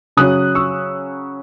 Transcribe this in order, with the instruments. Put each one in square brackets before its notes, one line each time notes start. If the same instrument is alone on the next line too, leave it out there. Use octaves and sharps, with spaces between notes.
[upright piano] C#3 F#3 C#4 D#6 F#6
C#6 E6